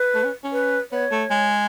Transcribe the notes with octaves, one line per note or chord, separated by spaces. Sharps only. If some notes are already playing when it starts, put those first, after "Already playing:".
Already playing: B4
A3
C#4
C#4
B4
B3 C#5
A3
G#3